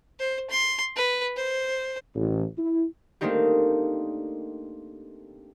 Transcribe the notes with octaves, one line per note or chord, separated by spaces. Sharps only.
C5
C6
B4
C5
A1
E4
A3 A#3 C4 D4 D#4 G4